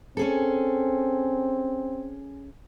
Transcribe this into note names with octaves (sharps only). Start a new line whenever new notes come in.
C4 C#4 G#4 A4